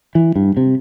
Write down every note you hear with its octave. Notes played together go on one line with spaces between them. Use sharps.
E3
G2
C3